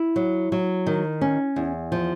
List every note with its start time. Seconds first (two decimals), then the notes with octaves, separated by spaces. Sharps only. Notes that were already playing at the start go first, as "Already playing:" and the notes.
Already playing: E4
0.16 F#3
0.52 F#3
0.87 D#3
1.21 C#4
1.56 E2
1.92 F3